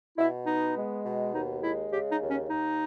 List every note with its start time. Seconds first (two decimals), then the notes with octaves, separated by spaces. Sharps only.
0.18 B2 E4
0.46 B3 D#4
0.76 G#3
1.05 B2
1.33 D#2 D#4
1.62 G#3 E4
1.92 C#3 G4
2.11 D#4
2.20 D#2
2.30 C#4
2.49 D#2 D#4